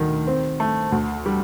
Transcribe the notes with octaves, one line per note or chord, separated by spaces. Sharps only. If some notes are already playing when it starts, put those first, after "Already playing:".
Already playing: D2 D#3
C4
A3
D2
G3